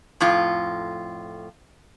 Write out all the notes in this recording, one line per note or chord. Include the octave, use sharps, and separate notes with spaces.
F2 A2 F4